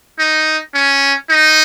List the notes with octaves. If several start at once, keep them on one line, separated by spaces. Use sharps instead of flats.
D#4
C#4
D#4